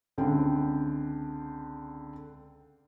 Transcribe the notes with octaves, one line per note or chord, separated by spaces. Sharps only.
C#2 D3 C4 G5